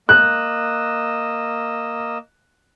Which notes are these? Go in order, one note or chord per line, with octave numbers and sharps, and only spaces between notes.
A#3 D#5 E6 F#6